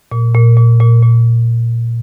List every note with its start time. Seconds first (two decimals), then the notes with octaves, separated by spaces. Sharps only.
0.12 A#2
0.35 A#2
0.57 A#2
0.80 A#2
1.03 A#2